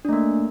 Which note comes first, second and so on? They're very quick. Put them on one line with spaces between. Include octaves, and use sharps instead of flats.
D4 A3 A#3